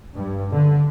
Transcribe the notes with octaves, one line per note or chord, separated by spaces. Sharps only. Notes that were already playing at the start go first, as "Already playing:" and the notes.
G2
D3